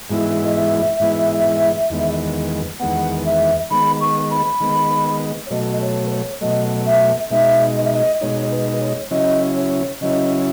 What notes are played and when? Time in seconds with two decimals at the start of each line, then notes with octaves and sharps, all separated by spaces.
0.10 G#2 E3 G#3 B3 E4
0.45 D#5
0.55 E5
1.00 G#2 E3 G#3 B3 E4
1.90 E2 D#3 G#3 B3
2.80 E2 D#3 G#3 B3 F#5
3.25 E5
3.71 D#3 G#3 B3 B5
4.01 C#6
4.31 B5
4.60 D#3 G#3 B3
5.46 C#5
5.50 B2 F#3 A3 D#5
5.72 D#5
5.81 C#5
6.06 B4
6.11 C#5
6.41 B2 F#3 A3 D#5
6.86 E5
7.30 B2 G#3 D#4 E5
7.76 D#5
7.85 E5
7.92 D#5
8.21 B2 G#3 D#4 C#5
8.51 B4
8.81 C#5
9.11 C#3 F#3 C#4 E4 D#5
9.56 C#5
10.01 C#3 F#3 C#4 E4 D#5